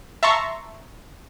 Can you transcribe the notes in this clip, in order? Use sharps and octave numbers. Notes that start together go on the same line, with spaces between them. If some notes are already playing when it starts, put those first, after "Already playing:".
E5 A5 A#5 C6 C#6